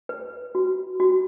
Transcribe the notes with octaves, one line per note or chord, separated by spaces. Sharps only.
B4
F#4
F#4